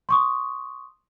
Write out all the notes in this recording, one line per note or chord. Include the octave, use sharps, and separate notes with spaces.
C6 C#6 D#6